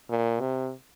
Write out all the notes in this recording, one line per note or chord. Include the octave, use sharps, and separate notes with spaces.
A#2
C3